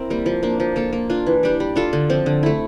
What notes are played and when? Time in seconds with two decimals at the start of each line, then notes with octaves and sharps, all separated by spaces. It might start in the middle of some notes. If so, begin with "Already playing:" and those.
Already playing: C4 E4 A#4
0.10 G3 A#3
0.26 F3
0.43 A#3 D4
0.60 F3
0.76 A#3 F4 A4
0.93 A#3
1.10 D4 F4
1.26 E3
1.43 G3 D4 G4
1.60 G3
1.76 D4 F4 A4
1.93 D3
2.10 F3 C4
2.26 D3
2.43 A3 E4